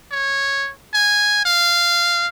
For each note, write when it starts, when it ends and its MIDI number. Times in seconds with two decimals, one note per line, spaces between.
0.11 0.70 73
0.94 1.45 80
1.45 2.27 77